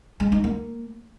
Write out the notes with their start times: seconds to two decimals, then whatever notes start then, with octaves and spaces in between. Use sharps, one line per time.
0.20 G#3
0.32 D#4
0.44 A#3